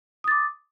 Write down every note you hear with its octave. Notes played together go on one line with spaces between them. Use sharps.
D6 D#6 A6